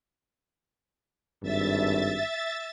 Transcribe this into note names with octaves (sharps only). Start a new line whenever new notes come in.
G#1 G2 E5 A6